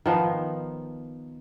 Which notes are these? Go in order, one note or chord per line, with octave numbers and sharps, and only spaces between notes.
D#3 F3 B3